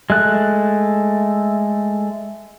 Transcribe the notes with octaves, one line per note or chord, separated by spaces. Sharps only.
G#3 A3 F#6